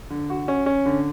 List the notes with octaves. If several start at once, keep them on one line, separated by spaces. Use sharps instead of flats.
D3
F#4
C#4
C#4
D3